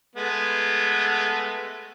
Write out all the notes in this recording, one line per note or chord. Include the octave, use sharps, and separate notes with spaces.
G#3 A3 B3